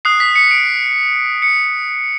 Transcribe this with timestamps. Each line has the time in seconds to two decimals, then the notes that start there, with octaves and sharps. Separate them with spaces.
0.05 D#6 F#6 C7
0.20 B6
0.35 C#7
0.51 D7
1.42 C#7